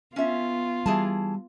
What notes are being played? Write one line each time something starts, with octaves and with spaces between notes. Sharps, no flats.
B3 C#4 F4 E5
E3 G3 G#4 A5